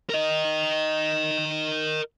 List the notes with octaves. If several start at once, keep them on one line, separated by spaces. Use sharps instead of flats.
A#4 D#5